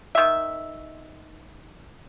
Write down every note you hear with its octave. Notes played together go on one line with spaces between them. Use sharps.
D#3 E5